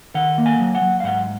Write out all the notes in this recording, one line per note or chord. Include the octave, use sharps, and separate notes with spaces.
D#3 F#5
A#3
G#5
F#3
F#5
F#3
F5
G#2 F#5